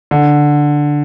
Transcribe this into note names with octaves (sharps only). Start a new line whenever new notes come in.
D3